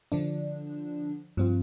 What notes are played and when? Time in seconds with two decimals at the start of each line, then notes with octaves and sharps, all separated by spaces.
0.12 D3 F3 D4
1.37 G2 F3 C4 F4